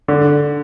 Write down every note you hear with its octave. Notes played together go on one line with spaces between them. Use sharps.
D3